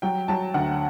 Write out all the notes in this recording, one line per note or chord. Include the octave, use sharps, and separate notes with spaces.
F#3 G5
F#3 A5
D2 F#5